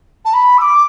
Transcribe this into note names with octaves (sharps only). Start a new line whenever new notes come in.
A5
B5
E6
D6